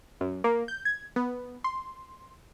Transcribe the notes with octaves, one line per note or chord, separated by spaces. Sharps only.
F#2
A#3
G6
G#6
B3
C6